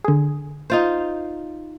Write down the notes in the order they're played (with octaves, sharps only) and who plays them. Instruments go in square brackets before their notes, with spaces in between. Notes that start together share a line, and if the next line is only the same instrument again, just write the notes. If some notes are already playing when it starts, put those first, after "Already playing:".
[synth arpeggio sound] D3 G#4
[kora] D#4 F4 C5